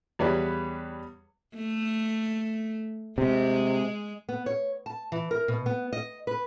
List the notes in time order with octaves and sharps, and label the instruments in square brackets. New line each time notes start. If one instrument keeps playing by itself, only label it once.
[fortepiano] E2 G3 B4 C#5
[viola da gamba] A3
[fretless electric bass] C3 [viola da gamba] G#3
[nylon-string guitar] B3
C#5
A5
E3
A#4
B2
B3
D#5
B4